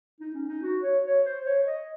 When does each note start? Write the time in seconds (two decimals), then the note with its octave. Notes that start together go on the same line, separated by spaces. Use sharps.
0.20 D#4
0.35 C#4
0.48 D#4
0.62 F#4
0.83 C#5
1.04 C#5
1.25 C5
1.46 C#5
1.67 D#5